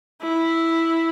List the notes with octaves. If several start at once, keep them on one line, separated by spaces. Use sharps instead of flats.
E4